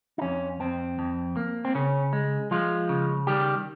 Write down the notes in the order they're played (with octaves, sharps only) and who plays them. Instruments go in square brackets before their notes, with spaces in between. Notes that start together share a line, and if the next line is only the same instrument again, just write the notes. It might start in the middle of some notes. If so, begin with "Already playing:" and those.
[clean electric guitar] D#4
F2 C#4
F2 C4
F2
A#3
C4
C#3 C#4
G#3
F3 G#3 F4
C#3
D#3 G3 G4